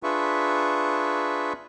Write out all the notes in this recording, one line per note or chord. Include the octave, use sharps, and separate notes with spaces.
D4 F4 G#4 B4 E5 C#6